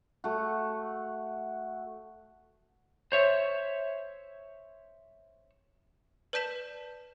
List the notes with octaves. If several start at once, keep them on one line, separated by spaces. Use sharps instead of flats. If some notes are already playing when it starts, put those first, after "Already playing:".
A3 F#4
C5 C#5 E5
B4 D5 A5 G6 B6 E7